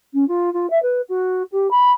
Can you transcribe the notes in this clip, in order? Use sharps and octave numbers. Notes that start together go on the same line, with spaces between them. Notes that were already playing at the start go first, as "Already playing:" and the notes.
C#4
F4
F4
E5
B4
F#4
G4
B5